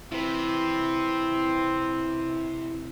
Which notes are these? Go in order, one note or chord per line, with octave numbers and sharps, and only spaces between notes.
C3 C4 E4 B4